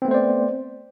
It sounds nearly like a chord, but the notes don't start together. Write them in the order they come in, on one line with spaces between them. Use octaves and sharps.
C4 B3 A3 C5 D5